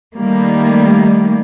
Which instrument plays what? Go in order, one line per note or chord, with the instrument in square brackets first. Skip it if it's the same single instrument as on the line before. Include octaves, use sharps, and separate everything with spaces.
[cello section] D#3 G3 A3 A#3